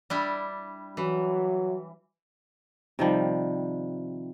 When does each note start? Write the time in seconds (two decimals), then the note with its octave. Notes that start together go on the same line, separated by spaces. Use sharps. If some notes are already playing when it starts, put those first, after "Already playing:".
0.10 G3 D4 E4
0.97 E3 F#3
2.99 C3 D#3 F3 G3